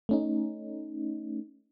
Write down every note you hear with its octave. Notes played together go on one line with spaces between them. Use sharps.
A3 C#4 D#4